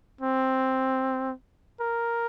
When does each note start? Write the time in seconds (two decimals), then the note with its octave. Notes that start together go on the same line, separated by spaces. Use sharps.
0.21 C4
1.81 A#4